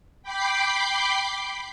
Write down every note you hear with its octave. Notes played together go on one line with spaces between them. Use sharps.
G5 B5 D6 G6 C7